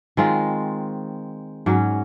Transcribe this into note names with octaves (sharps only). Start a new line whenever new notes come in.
D#3 G#3 C4 F4
G#2 F#3 C#4